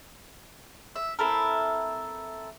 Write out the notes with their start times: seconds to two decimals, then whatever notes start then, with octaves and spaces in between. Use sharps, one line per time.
0.96 E5
1.19 C4 E4 A4 A#4